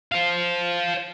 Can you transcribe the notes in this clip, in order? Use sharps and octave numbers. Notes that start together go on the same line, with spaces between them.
C5 F5